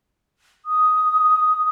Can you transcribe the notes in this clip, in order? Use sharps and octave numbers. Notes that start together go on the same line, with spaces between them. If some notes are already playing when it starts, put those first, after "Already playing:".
D#6